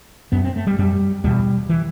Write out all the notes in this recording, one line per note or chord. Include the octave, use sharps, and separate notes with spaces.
F#2 B3
C4
A3
G3
F#2 G3
E2 B2 G3
E3